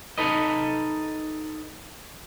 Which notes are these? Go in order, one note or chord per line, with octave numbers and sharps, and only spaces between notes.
D#4 A4 B4 D#5